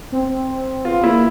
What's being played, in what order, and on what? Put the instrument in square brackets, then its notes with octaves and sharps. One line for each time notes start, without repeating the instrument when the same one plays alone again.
[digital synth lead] C4
[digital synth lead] B3 [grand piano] F4
[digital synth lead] A#3 [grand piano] E4